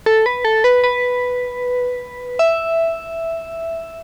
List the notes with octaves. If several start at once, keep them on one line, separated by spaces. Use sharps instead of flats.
A4
B4
A4
B4
B4
E5